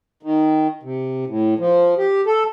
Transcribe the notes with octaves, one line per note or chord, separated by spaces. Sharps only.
D#3
C3
A2
F3
G4
A4